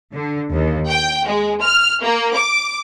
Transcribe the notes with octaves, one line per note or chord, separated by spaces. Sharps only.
D3
D#2
G5
G#3
F6
A#3
D6